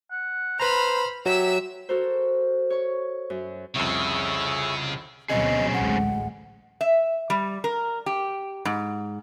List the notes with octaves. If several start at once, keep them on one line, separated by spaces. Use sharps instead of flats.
F#5
B4 C5 A#5 B5 F6
F#3 G4 E5 E6
F#4 A4 A#4 C5
C#5 C#6
F#2
C2 F2 C#3 G#4 C#5 E5
D2 B2 F#3 C4 C#4 G#4 D#5
A1 D2 G#3 F#5
E5
G3
A#4
G4
G#2